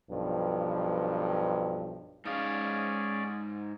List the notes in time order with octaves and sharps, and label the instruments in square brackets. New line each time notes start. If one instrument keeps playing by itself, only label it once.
[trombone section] B1 G2 F3
[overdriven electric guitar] G#2 F5 [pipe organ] C#4 G#4 D5